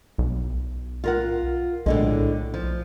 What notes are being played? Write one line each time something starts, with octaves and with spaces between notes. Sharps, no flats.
B1
F4 A#4 F#5
B1 A2 D3 G#3
F3